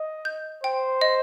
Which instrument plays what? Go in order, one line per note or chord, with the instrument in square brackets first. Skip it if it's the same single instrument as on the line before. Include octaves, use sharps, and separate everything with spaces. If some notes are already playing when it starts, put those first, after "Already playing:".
Already playing: [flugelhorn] D#5
[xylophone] G6
[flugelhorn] C5 [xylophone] G5
[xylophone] D#5